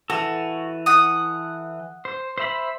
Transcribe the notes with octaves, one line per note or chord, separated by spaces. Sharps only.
E3 F#4 A4
F#5 D#6
C5
C5 E5 B5